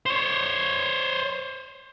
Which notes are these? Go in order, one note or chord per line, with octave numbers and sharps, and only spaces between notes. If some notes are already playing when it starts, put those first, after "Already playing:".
C5 C#5